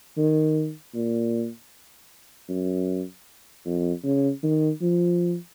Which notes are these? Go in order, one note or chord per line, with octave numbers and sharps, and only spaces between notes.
D#3
A#2
F#2
F2
C#3
D#3
F3